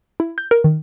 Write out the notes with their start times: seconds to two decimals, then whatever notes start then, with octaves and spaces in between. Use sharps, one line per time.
0.20 E4
0.38 G6
0.51 A#4
0.64 D#3